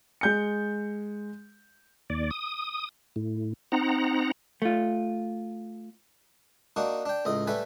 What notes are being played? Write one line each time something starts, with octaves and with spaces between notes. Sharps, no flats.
G#3 G6 C#7
D#2 D5
D#6
A2
C4 D#4 F#5 A#5
A3 F4
A#3 D4 D#4 F#4
D4 G5
C#2 A2 D#5
G3 A3 B4 G#5